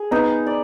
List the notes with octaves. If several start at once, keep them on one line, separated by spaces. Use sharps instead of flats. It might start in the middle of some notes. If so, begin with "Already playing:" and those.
Already playing: G#4
B3 D#4
D5